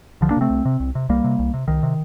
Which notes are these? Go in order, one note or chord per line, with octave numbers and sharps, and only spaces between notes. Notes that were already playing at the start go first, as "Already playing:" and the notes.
C2 D3 F3
A#3 D4
C3 A3 C4
C2
C3
C2
C3
C2 G3 A#3
C3
C2
C3
C2 D#3
C3